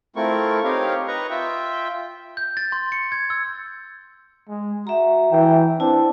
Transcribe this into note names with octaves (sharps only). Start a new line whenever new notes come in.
A3 C4 E4 F4 A#4 C#6
C4 D#4 G4 A#4 C#5 F5
B4 D#5 A#5 C#6
F4 E5 G5
G6
A6
C6
C#7
G#6
E6
G#3
F#4 E5 A#5
E3 G5
C4 D4 E4 A5